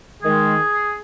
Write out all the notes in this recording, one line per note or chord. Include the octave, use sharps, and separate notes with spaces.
D#3 G#3 G#4